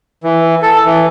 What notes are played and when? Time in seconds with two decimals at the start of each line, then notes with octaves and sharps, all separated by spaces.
0.23 E3
0.62 A4
0.85 E3